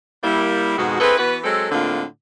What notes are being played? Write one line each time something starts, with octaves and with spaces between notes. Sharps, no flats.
G3 A#3 E4
F2 G#2 B2 G#3 F#4
C4 E4 G#4 A4 B4
E3 B3 F#4 B4
F#3 G#3 C4 A4
A2 D3 G#3 A#3 C4 F4